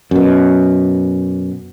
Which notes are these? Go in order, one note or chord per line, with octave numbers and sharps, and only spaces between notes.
F#2 B2